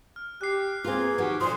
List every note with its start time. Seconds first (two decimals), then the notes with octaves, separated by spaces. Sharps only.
0.16 F6
0.41 G4 F#6 C7
0.84 A#3 C4 F4 G#4 B4
1.18 D#3 F3 F#3 F#4 G4
1.41 F2 A#2 F3 F#3 C6 D#6